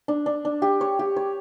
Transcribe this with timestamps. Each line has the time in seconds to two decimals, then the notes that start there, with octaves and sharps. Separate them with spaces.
0.08 D4
0.26 D4
0.45 D4
0.62 G4
0.81 C#5
0.99 G4
1.16 C#5